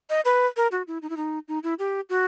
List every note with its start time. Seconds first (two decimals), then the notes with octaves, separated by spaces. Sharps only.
0.10 D#5
0.25 B4
0.57 A#4
0.72 F#4
0.87 E4
1.02 D#4
1.10 E4
1.17 D#4
1.48 D#4
1.63 E4
1.79 G4
2.10 F#4